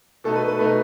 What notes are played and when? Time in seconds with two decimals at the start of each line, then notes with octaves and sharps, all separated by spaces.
0.24 B2 A3 D#4 A4
0.35 B4
0.48 B4
0.59 B2 A3 D#4 B4